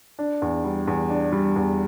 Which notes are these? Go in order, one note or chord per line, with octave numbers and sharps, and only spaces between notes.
D4
E2
G3
E2
D4
G3
E2